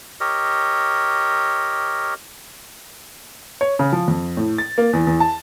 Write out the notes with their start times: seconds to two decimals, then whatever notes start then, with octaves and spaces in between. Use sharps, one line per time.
0.20 G4 A#4 C#5 D#5
3.61 C#5
3.79 C#3
3.93 F3
4.08 F2
4.37 A2
4.58 A6
4.78 A#3
4.93 E2
5.07 E2
5.20 A5